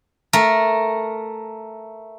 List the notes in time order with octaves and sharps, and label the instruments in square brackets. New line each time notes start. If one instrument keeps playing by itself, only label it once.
[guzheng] A3 A#4